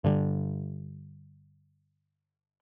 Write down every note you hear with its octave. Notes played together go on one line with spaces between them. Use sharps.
G2 D3 G3